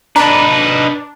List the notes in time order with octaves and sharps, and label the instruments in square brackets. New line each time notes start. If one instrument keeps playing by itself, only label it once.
[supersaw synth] D4 [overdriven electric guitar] D#4 B4 [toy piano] A#5